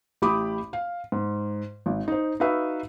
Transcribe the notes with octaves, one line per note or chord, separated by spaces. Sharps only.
A1 G4 B5 D6 D#6
F5
G#2
G#1
D#4 C5
D#4 F#4 B4 E5 F5